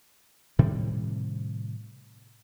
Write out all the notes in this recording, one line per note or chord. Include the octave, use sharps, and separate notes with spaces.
A2 C3 D#3 G3